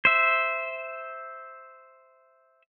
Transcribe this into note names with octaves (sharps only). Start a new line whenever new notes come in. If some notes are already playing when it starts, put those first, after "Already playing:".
C5 E5